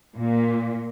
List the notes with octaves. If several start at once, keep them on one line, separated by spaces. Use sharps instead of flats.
A#2